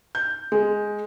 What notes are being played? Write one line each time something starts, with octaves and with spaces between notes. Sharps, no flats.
G6
G#3